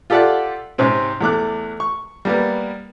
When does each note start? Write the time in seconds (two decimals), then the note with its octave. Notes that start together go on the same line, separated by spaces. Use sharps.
0.10 F4 G4 A4 D5 E5 F#5
0.78 G#2 C3 C4 C#4
1.21 E2 A3 D6 F#6
1.80 C#6
2.25 G3 A#3 B3